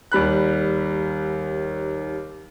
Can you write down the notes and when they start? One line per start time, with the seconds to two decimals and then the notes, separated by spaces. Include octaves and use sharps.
0.12 D#2 G3 B5 F#6